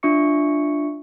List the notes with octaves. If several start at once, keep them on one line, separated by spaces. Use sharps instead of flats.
D4 F4 E5 C#6 C#7